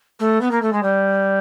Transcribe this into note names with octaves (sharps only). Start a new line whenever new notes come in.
A3
B3
A#3
A3
G#3
G3